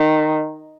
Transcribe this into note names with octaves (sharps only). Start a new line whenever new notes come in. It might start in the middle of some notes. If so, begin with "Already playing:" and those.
Already playing: D#3